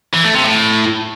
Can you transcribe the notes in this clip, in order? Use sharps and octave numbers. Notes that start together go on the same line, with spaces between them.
E3
A3
C3
A2